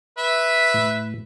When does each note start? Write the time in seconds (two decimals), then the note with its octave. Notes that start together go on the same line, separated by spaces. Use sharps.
0.18 B4 E5
0.74 A2